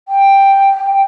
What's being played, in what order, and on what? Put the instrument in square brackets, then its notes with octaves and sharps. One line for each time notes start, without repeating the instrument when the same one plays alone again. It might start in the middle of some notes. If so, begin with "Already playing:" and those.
[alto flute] G5